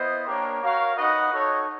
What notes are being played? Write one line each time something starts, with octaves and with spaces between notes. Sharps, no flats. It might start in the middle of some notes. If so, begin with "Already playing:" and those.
Already playing: B3 E4 C5 D#5
A#3 D4 G4 A#4 C#5
F#4 A#4 C#5 F5
D#4 F#4 B4 D#5 F#5
D#4 F#4 A4 C#5